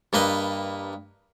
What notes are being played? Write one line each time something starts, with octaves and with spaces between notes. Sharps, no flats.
G2 A#3 B4 D#5